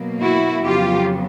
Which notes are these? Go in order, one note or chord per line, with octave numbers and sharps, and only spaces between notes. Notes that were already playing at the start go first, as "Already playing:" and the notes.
Already playing: B2 F#3 A#3
E4 F#4
F2 C#3 F#3 B3 F4 G4